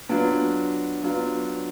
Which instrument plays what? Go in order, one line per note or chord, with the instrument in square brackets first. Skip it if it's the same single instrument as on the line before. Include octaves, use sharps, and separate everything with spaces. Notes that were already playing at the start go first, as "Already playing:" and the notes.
[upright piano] F#3 B3 D4 F4
F#3 B3 D4 F4